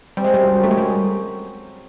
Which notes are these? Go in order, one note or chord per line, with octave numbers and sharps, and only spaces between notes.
G3 C4
G#3
G3
F#2
F#2 A3
G#3
G3
G#3